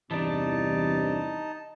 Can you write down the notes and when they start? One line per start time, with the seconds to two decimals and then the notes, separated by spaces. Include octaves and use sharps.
0.11 E2 G2 C3 E3 D4 D#4 A5